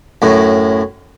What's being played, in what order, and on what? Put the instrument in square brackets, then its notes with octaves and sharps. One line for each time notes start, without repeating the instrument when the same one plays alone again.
[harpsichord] F#2 A2